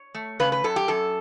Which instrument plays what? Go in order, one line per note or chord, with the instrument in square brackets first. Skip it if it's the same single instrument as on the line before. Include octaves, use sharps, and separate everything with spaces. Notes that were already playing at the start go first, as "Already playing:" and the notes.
Already playing: [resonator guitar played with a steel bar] C#5
A3
C#3 B4
B4
F#2 A4
G4
F#2 A4